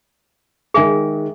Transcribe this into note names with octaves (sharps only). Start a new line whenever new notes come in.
D#3 G#3 G#4 E5 G#5